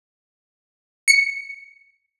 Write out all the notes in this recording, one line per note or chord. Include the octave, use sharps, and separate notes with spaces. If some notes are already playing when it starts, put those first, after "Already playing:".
C#7